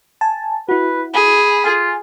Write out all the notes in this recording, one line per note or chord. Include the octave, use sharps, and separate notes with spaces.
G#5 A5
E4 F#4 B4
G#4 B5
F4 G#5